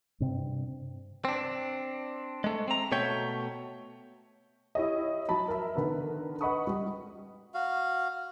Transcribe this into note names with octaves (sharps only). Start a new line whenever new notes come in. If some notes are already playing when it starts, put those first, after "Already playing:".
G2 C3 C4
C4 D4
G#3 A3
C4 A#5
B2 A3 C#5 E5 G5
E4 G4 C#5 D#5
F#3 A5 B5
A#4 E5
D3 D#3 B3 A#4 B4
B4 D#5 F#5 B5 C#6 D#6
G3
F#4 F5